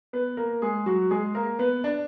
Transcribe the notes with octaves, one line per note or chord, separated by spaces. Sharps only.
B3 B4
A#3 A#4
G#3 G#4
F#3 F#4
G#3 G#4
A#3 A#4
B3 B4
D4 D5